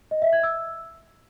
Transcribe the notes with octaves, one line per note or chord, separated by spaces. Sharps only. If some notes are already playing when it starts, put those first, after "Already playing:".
D#5
E5
G#6
E6